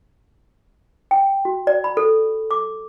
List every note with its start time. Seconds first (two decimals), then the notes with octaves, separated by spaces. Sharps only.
1.11 G5
1.45 F#4
1.67 D5
1.84 B5
1.97 A4
2.51 D6